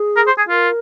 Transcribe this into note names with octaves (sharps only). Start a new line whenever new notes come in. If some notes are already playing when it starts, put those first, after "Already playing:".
Already playing: G#4
A#4
C5
G#4
F4 A#4